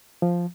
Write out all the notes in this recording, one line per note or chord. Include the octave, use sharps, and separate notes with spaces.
F3